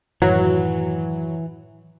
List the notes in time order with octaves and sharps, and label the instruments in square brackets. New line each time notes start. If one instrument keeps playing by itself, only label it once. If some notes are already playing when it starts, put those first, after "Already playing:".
[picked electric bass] F#2 A2 D#3 [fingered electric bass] E3 [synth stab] F#3